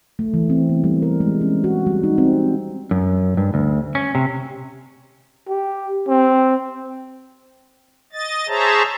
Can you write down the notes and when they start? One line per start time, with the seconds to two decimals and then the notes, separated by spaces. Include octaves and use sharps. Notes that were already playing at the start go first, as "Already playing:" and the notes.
0.19 A3
0.34 E3
0.50 C4
0.69 B3
0.84 G3
1.02 A#4
1.20 G#3
1.41 C#4
1.64 F#4
1.87 G3
2.03 D#4
2.18 C4
2.91 F#2
3.37 G2
3.54 D2
3.95 C#4
4.15 C3
5.49 G4
6.08 C4
8.13 D#5 A6
8.48 G#4 C5 C#5 E5 A5 A#5